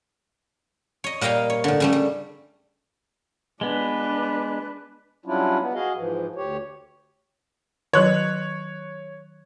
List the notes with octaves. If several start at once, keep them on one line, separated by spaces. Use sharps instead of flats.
C#5 D#5
A#2 G3 D#5 F5 G5
C#5
A2 D3
C#3 G3 A3
G3
G#3 B3 D4 B4
F#3 G3 C#4 D4 E4 F4
B3
F#4 G#4 D#5 F5
G#2 E3 F3
D2 G4 C#5
D#3 F#3 C#5 F#6